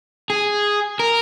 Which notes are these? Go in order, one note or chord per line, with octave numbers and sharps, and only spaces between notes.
G#4
A#4